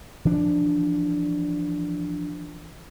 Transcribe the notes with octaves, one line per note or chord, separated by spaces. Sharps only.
E3 F3 D4